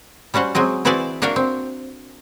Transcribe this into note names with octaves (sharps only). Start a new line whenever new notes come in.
G3 C#4 F#4 C5 F#5
F#3 G#3 C4 D#5
E3 C4 E4 F#4 G#4 D5
A#3 D4 F#4 A#4 F5 G5
C4